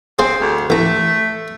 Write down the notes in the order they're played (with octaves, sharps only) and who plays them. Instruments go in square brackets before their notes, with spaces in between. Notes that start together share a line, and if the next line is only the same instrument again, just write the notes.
[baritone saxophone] C4 [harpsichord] G#4 C5 F5
[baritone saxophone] D2
[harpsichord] A1 A#5 [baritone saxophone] A3